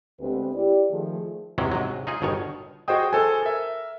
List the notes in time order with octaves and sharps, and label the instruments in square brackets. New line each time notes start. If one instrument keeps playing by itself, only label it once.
[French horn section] D2 G#3 B3 C4 G4 B4
E4 G4 D5
D#3 F3 A3 G#4
[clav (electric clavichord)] E2 C3 F#3 G#3 C#4
G#2 C3 F#3
D#4 F4 G#4
G1 B2 D#3 C#5
[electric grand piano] F#4 G#4 C5 D#5 G5 D#6
A4 C5 G#5
A#4 E5